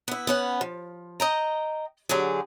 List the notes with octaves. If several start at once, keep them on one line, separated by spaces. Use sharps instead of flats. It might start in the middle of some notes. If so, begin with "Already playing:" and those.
B3 E4
B3 C#4 F#5
F3
D#5 G5 A#5
D3 F#3 G4 G#4